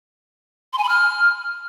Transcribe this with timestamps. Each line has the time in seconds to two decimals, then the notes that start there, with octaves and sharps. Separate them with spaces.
0.73 C6
0.78 G#5
0.84 B5
0.89 F6